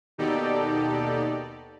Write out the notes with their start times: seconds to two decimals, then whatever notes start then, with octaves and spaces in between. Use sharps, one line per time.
0.18 D#2 B2 D#4 G4 A4 D5